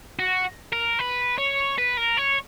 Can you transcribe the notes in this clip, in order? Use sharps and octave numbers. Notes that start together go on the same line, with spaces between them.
F#4
A#4
B4
C#5
B4
A#4
C#5